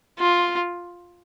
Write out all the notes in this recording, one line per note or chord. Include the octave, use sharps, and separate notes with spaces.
F4